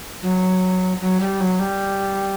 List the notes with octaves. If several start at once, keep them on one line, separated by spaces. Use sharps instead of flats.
F#3
F#3
G3
F#3
G3